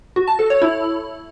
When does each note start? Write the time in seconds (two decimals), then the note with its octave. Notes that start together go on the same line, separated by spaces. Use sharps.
0.16 F#4
0.28 A5
0.39 A4
0.50 C#5
0.62 E4